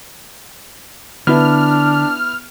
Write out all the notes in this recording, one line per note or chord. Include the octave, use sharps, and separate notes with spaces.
D3 B3 D4 E4 F6